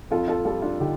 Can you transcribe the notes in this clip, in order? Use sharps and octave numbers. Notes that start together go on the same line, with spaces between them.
F2 F4 A4
F4 A4
G3 F4 A4
D4 F4
D3 D#4 G4